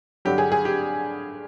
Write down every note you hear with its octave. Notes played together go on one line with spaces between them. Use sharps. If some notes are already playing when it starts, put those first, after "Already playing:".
G2 D3 F#3 G4
G#4
G#4
G4